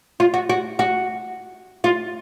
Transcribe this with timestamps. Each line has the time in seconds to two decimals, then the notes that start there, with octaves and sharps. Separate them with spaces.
0.20 F4
0.34 F#4
0.49 F#4
0.79 F#4
1.84 F4